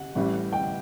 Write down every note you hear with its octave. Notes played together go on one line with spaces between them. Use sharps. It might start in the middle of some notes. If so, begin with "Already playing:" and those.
Already playing: F#5
A1 A2 E3 G3
G5